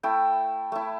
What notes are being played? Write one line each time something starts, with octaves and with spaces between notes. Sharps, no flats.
A3 E4 G5
A3 E4